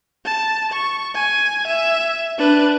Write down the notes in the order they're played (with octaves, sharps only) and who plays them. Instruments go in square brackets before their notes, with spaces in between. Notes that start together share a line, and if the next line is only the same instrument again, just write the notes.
[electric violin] A5
C#6
G#5
E5
D4 B4